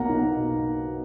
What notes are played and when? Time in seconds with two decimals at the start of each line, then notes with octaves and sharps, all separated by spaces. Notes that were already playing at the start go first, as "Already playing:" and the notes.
Already playing: B1 A#3 F#5 A#5
0.09 D#4
0.24 B2